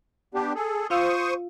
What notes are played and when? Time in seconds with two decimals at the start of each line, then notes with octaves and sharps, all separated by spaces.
0.34 B3 D4 G4
0.55 G#4 A4
0.90 F4 C5 F5 C#6 D#6 E6